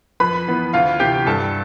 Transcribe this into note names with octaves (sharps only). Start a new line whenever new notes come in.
F2 B4 B5
E3 B3
D2 F4 F5
C3 E3 G4 G5
G2 A4 A5